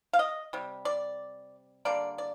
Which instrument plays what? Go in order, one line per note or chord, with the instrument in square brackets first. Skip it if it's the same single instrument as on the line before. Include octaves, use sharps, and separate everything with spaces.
[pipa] F5
D#5
C3 G3
D5
D3 G3 A#3 D5
D5